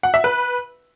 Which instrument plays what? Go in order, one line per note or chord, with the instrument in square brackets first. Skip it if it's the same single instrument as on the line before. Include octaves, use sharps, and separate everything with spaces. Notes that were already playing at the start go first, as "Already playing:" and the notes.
[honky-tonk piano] F#5
E5
B4